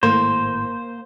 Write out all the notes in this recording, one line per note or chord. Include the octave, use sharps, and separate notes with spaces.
G#1 A2 A#3 C5